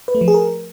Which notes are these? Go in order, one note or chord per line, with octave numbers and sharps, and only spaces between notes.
B4
A3
F3
G#4
A#4